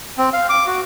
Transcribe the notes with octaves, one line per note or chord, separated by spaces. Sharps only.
C4
F5
D6
F#4